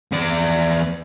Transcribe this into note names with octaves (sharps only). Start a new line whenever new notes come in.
E2 D5